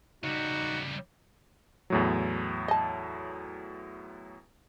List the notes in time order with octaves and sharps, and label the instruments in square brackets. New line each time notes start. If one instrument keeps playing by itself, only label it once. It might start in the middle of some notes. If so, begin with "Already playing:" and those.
[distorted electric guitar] C#3 G3 [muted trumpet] D#4 [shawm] F#4
[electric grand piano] E2 A2 F#3
[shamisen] D#5 A5